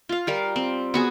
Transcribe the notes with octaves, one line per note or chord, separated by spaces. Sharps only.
F4 F5
G3 A#4 F5
C4
B3 F#4 G#4